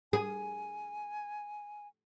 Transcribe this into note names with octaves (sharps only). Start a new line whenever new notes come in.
G#4 G#5